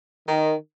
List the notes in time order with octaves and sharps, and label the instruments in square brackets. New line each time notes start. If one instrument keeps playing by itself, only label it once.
[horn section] D#3